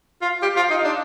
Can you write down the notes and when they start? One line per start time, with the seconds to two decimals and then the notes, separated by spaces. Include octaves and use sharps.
0.22 F4
0.42 G4
0.56 F4
0.70 D#4
0.84 D4